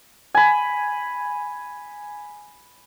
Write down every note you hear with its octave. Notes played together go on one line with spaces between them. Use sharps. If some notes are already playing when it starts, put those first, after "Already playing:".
G#5 B5